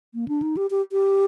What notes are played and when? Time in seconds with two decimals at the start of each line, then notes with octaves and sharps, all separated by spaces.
0.14 A#3
0.28 D4
0.42 D#4
0.57 G4
0.71 G4
0.92 G4